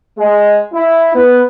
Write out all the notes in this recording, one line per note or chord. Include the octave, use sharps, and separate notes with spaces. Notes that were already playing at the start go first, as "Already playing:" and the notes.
G#3
E4
B3